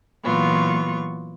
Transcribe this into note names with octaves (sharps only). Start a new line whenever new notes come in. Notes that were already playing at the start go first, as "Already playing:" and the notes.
A#2 E3 F#3 B3 F4 C#6